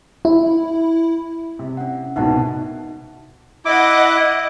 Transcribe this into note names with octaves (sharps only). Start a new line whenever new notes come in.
E4
C3
C#4 F#5
C2 G#2 B2 D#4 F#5 A5
E4 D#5 F#5 D6